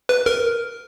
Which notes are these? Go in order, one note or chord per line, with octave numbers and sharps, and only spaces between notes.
B4
A#4